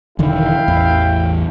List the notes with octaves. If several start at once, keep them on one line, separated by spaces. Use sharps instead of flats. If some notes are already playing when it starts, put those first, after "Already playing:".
E1 D3 D#3 E4 F5 G5
A1 E2